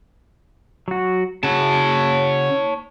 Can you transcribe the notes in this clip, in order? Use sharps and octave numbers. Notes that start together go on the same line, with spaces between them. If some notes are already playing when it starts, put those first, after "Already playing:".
F#3 F#4
C#3 F#4 C#5 A5